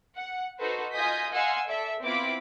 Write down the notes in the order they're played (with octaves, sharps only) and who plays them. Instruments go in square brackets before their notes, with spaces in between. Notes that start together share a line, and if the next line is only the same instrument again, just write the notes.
[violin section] F#5
D#4 F#4 A4 B4 C5
F4 D#5 G#5 D#6 G6 B6
D#5 F5 F#5 G#5 C6 E6
A4 D5 E5
B3 C4 E4 F4 B5 D6